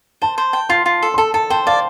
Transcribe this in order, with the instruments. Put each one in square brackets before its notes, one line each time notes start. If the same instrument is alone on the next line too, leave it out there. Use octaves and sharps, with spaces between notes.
[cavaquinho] C5 [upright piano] A5
[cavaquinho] C5
G5
[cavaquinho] F4 [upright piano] C6
[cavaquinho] F4
A4
[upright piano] C6
[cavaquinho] A4 [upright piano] A5
[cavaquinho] A4 [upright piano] A5
[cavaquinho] C5 [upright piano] G5
[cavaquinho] D5 [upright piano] F5